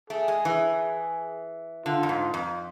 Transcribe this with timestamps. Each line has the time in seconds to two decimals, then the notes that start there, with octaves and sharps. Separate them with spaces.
0.10 A3 G#4
0.28 G#3
0.45 E3
1.86 D3 F4
2.03 F2
2.09 G#2
2.34 F2